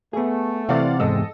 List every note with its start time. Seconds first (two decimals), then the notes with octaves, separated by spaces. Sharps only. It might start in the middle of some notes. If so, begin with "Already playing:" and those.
0.13 A3 B3 G#4
0.69 C3 E3 C4 D5 F5 F#5
1.00 E2 G#2 G#3 A4 D#5 E6